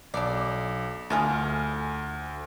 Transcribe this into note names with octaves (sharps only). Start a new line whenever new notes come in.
B1 D4 D5
D2 D4 F4 G#4